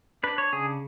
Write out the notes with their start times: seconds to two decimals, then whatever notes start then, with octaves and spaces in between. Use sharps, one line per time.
0.23 D4 B4
0.38 C#5
0.52 C#3 G#4